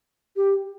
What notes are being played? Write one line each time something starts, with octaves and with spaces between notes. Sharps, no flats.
G4